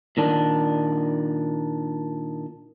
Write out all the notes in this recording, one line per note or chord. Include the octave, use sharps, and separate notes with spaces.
A#2 D#3 D4